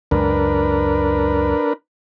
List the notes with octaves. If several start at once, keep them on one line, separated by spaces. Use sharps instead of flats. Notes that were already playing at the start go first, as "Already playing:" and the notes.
C#2 F#2 G#3 D4 A#4 B4